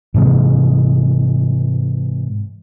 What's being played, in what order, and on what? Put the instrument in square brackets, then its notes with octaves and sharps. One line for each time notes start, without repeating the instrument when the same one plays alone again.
[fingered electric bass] G#2 C3 E3 G#3